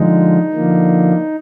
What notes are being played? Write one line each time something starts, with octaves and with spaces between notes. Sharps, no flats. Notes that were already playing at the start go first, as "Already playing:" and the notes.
Already playing: D3 F3 G#3 D#4
D3 F3 A#3